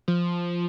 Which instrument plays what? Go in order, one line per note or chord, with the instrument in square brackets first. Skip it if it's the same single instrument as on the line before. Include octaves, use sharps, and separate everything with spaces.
[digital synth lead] F3